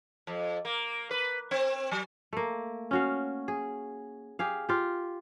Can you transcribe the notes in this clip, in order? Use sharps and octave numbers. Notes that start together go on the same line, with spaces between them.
F2
A#3
B4
C4
F#3
A3 A#3
C#4 F#4 F5
G#4
G4 G#4 F5
F4 G4